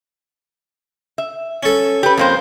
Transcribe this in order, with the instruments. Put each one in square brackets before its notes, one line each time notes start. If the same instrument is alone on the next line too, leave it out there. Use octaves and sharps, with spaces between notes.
[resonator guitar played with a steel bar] E5
[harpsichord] C#4 A4
[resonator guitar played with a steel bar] G4 B4
F2 A#3 C5